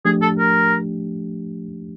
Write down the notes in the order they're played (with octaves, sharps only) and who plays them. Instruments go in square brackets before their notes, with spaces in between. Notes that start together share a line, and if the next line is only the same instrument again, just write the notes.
[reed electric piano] F3 A3 D4 G4 [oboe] G#4
[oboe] A4
A#4